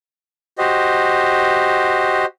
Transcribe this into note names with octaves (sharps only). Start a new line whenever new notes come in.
F#4 G4 C5 D#5